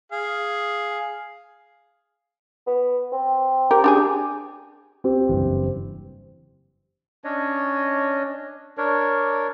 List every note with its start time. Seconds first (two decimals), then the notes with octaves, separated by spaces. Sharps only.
0.12 G#4 F5
2.67 B3
3.12 C4
3.71 G4 A#4
3.84 D4 G4 G#4
5.04 C4 G4
5.29 F#1 G2 E3
7.24 C#4 D4 C#5 D#5
8.78 D4 A#4 C#5